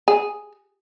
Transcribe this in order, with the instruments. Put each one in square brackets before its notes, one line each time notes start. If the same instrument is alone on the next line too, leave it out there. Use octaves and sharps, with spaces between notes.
[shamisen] G#4